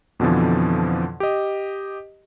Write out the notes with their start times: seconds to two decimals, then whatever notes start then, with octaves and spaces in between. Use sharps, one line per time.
0.19 F2 B2 D3 E3 F3
1.20 G4 D#5